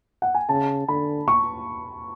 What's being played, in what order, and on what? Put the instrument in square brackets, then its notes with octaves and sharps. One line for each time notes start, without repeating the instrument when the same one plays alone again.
[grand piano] F#5
G#5
[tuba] C#3 [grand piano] A5
[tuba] D3 [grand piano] B5
[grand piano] C#6